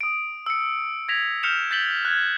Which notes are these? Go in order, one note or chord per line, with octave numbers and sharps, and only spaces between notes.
D#6 D7
E6 C#7
G#6 A#6 B6 F7
F6 G6 B6 C#7 E7 F7
G6 A6 B6 F#7 G7
F#6 G#6